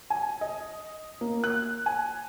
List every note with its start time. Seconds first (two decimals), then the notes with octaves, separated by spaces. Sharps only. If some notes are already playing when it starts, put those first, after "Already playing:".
0.10 G#5
0.41 D#5
1.21 A#3
1.44 F#6
1.86 G#5